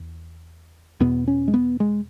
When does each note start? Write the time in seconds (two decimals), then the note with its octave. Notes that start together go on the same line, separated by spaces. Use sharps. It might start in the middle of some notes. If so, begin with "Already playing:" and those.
Already playing: E2
1.00 E2 B2 B3
1.28 C#4
1.48 G#3
1.54 B3
1.80 G#3